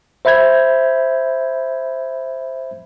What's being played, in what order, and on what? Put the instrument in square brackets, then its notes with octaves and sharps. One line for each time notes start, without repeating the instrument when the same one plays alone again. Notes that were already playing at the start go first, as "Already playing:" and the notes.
[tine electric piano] C5 E5 B5 G6 G#6